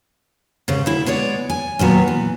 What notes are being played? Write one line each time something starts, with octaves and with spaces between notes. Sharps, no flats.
G#2 C#3
D2 E4
G#3 B3 C#5 D5
G#5
D#2 A#2 F#3 B3
E3